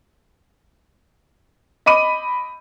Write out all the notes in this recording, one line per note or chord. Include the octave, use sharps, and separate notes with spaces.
D#5 B5 D6 D#7